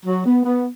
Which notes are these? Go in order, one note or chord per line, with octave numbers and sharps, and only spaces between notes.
F#3
B3
B3